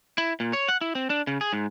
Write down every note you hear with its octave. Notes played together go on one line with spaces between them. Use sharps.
E4
A#2
C#5
F#5
E4
C4
D4
C#3
G#4
G#2